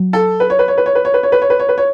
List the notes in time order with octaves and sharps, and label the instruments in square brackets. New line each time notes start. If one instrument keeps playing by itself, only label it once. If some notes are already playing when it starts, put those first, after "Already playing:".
Already playing: [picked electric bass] F#3
[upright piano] A4
B4
C#5
B4
C#5
B4
C#5
B4
C#5
B4
C#5
B4
C#5
B4
C#5
B4
C#5